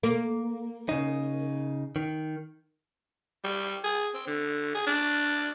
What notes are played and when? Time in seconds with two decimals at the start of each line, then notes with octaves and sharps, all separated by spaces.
0.03 A#3
0.89 C#3 D#4
1.96 D#3
3.44 G3
3.84 G#4
4.14 C4
4.27 D3
4.75 G#4
4.87 D4